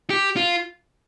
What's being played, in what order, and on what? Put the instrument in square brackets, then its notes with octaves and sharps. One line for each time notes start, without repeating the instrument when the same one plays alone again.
[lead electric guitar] G4
F4